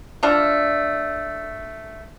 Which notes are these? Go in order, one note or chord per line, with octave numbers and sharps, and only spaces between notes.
A3 D4 F4